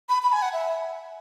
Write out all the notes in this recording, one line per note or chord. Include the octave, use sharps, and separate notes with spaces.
B5
B5
G#5
F#5
E5